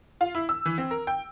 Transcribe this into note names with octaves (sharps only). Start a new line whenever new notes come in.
F4
E4
E6
E3
C4
A#4
G5